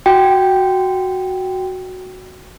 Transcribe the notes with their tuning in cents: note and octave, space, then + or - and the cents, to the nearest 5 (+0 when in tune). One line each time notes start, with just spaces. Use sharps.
F#4 +0 G5 +0